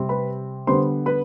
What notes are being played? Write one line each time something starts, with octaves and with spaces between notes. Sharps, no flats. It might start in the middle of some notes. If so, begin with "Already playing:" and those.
Already playing: C3 G3 C4
B4 B5
D3 G3 B3 C5 C6
B4 B5